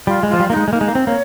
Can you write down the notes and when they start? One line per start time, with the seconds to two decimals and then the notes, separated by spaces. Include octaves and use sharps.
0.07 G3 F4
0.23 G#3
0.29 F3 F4
0.40 G3
0.50 A#3 D#4
0.56 G#3
0.68 G#3
0.73 A#3 D#4
0.81 G#3
0.88 A#3
0.95 C4
1.06 A#3 C#5